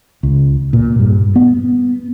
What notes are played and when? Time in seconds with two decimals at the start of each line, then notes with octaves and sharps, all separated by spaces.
0.23 C#2
0.73 A#2
0.99 G2
1.36 B3